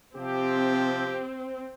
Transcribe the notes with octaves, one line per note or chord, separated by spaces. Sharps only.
C3 F3 C4 G4